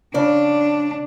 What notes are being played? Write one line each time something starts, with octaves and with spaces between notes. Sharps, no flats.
C#3 D4 D5